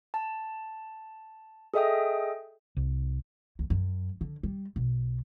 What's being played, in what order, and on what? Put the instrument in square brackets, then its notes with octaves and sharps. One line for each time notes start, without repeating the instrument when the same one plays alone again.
[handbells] A5
G#4 A4 D#5 E5 G5 D#6
[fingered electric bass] C2
[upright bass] D2
F#2
D3
G3
B1